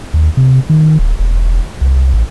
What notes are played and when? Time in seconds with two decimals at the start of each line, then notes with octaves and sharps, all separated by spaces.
0.14 D#2
0.37 C3
0.69 D#3
0.99 D1
1.19 E1
1.81 C2
2.14 A1